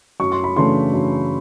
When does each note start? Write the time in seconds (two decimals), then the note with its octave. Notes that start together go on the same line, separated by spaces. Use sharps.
0.20 F#2 C#6
0.32 C6
0.44 B5
0.56 C#3 E3 A3 D4 C6
0.93 F#2